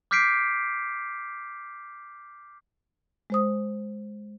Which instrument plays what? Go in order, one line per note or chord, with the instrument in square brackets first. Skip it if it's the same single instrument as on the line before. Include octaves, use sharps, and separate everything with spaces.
[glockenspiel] D6 F6 G6 B6 C7 D7
[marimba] G#3 C5 D#6